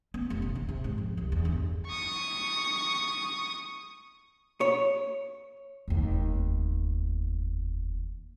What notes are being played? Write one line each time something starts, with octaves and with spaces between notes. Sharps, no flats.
B3
F1
C3
D#3
C3
G#2
F2
C2
E2
G1
C#6 D#6
C#5
F1 D#2